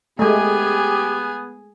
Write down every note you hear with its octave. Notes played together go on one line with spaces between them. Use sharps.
G#3 A3 B3 G4 G#4 G#5